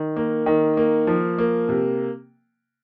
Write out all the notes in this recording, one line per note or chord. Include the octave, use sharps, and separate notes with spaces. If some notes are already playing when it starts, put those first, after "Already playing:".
Already playing: D#3
A#3
D#3
A#3
F3
A#3
C3